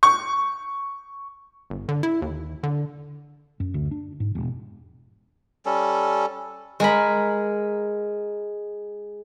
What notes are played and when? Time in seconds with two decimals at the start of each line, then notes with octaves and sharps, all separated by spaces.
0.03 C#6
1.70 G1
1.89 D3
2.03 E4
2.22 D#2
2.63 D3
3.60 F#2
3.74 D2
3.91 D4
4.20 G#2
4.35 E1
5.66 G3 C#4 A4
6.80 G#3 A#4 B5